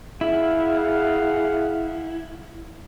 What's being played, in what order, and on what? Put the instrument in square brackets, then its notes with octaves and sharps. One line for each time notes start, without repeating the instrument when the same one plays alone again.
[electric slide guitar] E4 [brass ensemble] G#4 F5 F#5